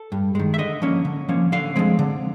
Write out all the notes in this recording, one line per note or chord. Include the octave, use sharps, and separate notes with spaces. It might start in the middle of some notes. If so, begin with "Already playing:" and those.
Already playing: A4
G2
D#3 G#3
E5
D3 D#5
F3 A#3 C#4
D3
F3 A#3 C#4
D3 F5
F3 G#3 C4
D3